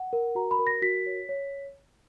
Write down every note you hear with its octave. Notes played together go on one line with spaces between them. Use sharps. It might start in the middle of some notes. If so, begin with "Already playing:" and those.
Already playing: F#5
A#4
F#4 A#5
B5
A#4
A#6
F#4 B6
C#5
C#5